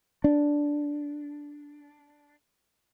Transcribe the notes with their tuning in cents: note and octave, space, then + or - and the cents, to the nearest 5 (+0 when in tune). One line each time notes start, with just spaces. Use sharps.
D4 -5